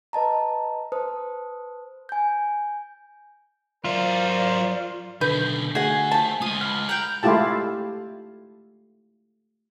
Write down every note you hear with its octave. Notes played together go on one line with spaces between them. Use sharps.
B4 D#5 A5 A#5
B4 C5 A5 D#6
G#5 G6
F#3 F4 A#4 C5 D5 E5
B2 D3 D#3 B4 G6
A3 F#4 G#4 F#5
F3 A5
G#3 F4 D#6
F#5 B5 F6
F#5 G5 A#5
G#3 A3 E4 F4 G4 A5